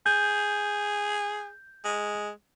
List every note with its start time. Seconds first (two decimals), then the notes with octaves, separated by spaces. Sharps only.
0.06 G#4 G6
1.85 G#3